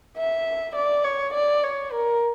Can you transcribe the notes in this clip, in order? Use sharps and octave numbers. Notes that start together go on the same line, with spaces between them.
E5
D5
C#5
D5
C#5
A#4